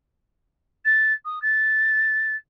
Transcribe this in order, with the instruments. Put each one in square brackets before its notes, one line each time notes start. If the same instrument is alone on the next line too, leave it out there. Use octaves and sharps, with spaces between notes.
[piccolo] A6
D#6
A6